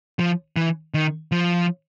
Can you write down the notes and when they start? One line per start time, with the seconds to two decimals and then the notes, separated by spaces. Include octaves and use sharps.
0.19 F3
0.57 E3
0.94 D#3
1.32 F3